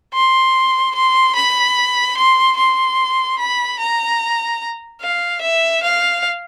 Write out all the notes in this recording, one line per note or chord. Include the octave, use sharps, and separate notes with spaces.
C6
C6
B5
C6
C6
B5
A#5
F5
E5
F5